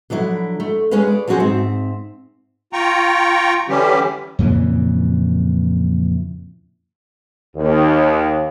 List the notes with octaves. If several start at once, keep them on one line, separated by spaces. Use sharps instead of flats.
D3 F3 F#3 E4
A3
G#3 C#4 G#4 B4 F5
D5
F3 F#3 C#4 F#4 G#4 C5
G#2 C4 E5
F4 G5 A#5 C#6
D3 E3 G3 C#4 G4
F2 A#2 C#3 E3
D#2